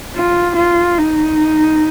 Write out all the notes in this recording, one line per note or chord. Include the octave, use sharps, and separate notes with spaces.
F4
F4
D#4